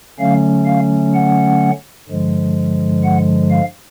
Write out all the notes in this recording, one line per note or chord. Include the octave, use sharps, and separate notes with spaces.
D3 F#3 A3 C#4 F5
F5
F#5
G2 D3 F3 G#3
F#5
F5